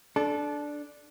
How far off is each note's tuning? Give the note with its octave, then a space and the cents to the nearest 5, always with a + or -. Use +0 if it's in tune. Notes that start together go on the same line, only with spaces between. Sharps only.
D4 +0 A4 -20